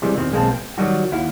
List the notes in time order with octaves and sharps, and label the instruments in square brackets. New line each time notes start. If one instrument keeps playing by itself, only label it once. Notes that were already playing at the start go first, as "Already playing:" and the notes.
[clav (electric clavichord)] C3 E3 G3 G#3
E2 D#3 C4
B1 G#3 A#3 C4 A5
G5
D#3 F#3 G3 F#4
D#2 E4 F5 F#5